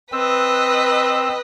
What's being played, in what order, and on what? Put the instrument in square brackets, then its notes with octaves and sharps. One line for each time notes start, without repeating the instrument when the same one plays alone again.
[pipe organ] C4 E6 [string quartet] B4 D#5